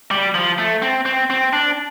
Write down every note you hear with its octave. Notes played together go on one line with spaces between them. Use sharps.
G3
F3
A3
C4
C4
C4
D4